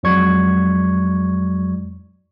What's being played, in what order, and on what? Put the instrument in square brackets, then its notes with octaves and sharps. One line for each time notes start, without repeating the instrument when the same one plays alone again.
[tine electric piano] F2 F#3 G#3 D5 C#6 G#6